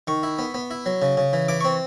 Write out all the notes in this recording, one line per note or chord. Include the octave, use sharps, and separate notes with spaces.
D#3 C#6
E4
B3
B3
E4
F#3
C#3
C#3
E3
E3 D6
C4 C#6